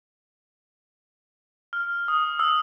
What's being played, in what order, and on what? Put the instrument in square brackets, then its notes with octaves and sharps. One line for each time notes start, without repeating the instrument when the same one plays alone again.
[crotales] F6
D#6
E6